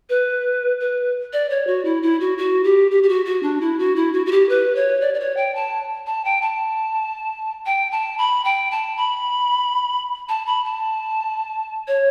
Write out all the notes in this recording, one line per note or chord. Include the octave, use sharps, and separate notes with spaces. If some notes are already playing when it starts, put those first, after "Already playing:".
B4
B4
D5
C#5
F#4
E4
E4
F#4
F#4
G4
G4
G4
F#4
F#4
D4
E4
F#4
E4
F#4
F#4
G4
B4
C#5
D5
D5
C#5
G5
A5
A5
G5
A5
G5
A5
B5
G5
A5
B5
A5
B5
A5
C#5